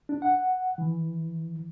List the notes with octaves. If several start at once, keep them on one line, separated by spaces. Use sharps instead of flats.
D4
F#5
E3